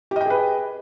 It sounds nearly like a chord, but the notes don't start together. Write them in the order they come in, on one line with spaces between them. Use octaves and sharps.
G4 D#5 G5 G#4 B4